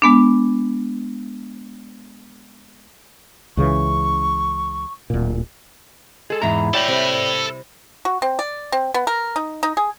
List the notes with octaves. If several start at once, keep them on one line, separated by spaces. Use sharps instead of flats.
G#3 B3 D4
C#2 C#3 E3 C#6
D1 A#2
G#3 G#4 A4
E2 G#2 E4 E5 A#5
A4 C#5 D5 G5 B5
C3 G3 B4
F#4
C4
D5
C4
B3
A#4
D#4
D#4
G#4